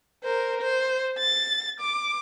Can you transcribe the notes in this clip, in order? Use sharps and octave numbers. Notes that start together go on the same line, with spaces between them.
A#4 C5
C5
A6
D6